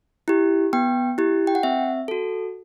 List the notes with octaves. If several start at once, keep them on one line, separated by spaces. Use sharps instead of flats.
E4 G4
B3 G5
E4 G4
G5
F#5
C4 E5
F#4 A4